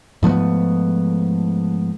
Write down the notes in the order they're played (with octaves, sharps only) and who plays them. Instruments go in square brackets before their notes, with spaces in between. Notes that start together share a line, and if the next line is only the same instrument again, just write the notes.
[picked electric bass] G#2 F3 A3 B3